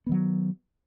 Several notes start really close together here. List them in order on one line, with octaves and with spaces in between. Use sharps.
B3 D#3 F#3